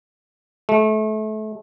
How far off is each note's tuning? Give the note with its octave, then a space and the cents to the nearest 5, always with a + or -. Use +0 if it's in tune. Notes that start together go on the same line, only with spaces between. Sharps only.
A3 -30